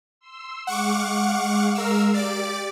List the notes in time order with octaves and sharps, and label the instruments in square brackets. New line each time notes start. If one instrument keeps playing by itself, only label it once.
[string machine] C6 E6
[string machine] G#3 F5 [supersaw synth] F#5 C#6 D6
[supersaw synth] A#4 E6
[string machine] G4 [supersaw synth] D5 D6